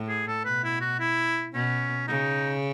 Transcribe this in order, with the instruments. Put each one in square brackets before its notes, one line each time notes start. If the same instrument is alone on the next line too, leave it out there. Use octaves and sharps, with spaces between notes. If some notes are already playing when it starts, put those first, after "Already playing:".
Already playing: [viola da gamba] A2
[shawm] G#4
A4
[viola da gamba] B2 [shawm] B4
[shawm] E4
F#4
E4
[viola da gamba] B2 [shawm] C#4
[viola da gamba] C#3 [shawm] D#4